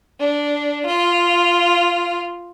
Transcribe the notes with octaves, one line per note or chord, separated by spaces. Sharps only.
D4
F4